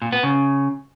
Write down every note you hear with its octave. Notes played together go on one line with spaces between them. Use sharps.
A#2
B3
C#3